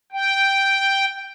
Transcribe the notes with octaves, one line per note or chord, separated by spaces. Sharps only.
G5